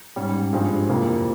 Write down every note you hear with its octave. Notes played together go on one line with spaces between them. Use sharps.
G#2 G3 C#4
G2 F3 G#3 C4 G4
F2 C3 E3 A#3 F4